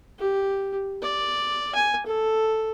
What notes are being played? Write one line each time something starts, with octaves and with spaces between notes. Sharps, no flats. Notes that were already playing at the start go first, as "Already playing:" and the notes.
G4
D5
G#5
A4